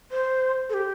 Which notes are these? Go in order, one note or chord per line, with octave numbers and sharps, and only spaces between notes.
C5
A4
G4